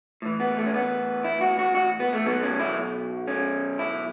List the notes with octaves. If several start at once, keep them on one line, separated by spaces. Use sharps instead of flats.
A2 E3
B3
A3
C#4
B3
E4
F#4
F#4
F#4
B3
A3
B2 F#3 B3
C#4
E4
C#4
E4